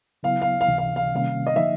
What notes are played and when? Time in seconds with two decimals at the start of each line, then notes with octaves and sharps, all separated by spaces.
0.23 C#3 F#3 B3 E4 F5
0.42 F5
0.61 F5
0.68 C#2 C3 E3
0.78 F5
0.96 F5
1.12 C3 D#3 G3 A#3 C#4 F5
1.46 D#5
1.56 D3 F3 A#3 D#4 E5